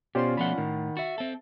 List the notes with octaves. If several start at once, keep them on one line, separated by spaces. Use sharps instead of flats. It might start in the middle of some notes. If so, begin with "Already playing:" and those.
B2 C#4 F4 G4 C5 D5 C6
B2 F3 A3 F#5 B5
A2 D#3
F#4 E5 A6
C4 A4